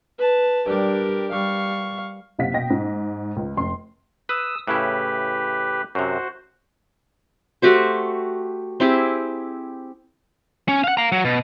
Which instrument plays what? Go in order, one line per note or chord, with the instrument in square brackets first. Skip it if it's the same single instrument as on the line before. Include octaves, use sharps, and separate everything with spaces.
[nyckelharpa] B4 A5
[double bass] G3 D4 [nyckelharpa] G4 A#4
[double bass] G3 [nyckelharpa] F5 C#6
[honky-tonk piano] F#1 C3 F5 F#5 B6
B2 D#5 G5 A#6
G#2
C#2
F1 C6
[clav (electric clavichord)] B4 [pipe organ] D#6 E6
[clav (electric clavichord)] A2 C#3 E4 [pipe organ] G4 B4
[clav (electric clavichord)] F#2 C3 [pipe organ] F#4 C5
[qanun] A3 F#4 G4 C5
C4 E4 G4 G#4
[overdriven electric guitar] C#4
F5 F#5
F5 A#5
F#3
B2